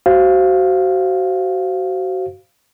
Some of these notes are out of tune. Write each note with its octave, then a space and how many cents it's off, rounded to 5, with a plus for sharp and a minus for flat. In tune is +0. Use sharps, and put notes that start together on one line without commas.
F#4 +25 C5 +0 F5 -15